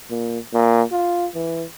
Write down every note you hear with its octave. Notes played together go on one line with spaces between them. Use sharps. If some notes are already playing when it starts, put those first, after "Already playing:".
A#2
A#2
F4
E3